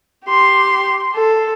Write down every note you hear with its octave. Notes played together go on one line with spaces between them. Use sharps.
G4 C6
A4